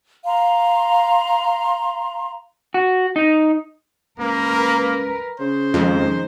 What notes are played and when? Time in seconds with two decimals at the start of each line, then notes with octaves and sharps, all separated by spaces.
0.24 F5 A#5 C6
2.74 F#4
3.16 D#4
4.20 C#2 A#3 A#4 B4
5.40 C#3 C5
5.74 F2 D#3 F3 G#3